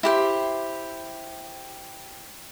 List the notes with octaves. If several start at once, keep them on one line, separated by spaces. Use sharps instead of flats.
E4 G4 C5